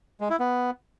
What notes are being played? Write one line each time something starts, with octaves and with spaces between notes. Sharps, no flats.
G#3
E4
B3